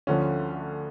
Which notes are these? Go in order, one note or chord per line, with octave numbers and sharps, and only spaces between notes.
D2 D3 F3 C#4